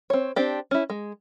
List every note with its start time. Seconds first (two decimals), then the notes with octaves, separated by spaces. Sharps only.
0.10 C4 C#5
0.36 C4 D4 G4
0.71 C#4 E4
0.90 G#3